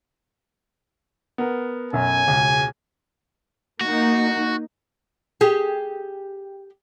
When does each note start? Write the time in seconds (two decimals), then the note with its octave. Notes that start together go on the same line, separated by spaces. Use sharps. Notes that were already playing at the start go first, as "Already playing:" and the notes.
1.38 B3 A#4
1.93 B1 F#2 G#5
2.27 E1 C#2
3.81 A#3 D#4 F#4
5.41 G4 G#4